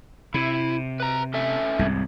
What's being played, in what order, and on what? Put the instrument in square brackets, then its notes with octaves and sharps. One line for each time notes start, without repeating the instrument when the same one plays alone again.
[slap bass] C3 [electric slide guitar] E4
[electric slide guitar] B4 A#5
C#4 A4 E5
[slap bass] C2 G#2